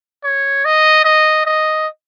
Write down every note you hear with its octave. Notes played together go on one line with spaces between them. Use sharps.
C#5
D#5
D#5
D#5